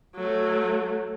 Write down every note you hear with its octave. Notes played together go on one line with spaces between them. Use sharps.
F#3 A3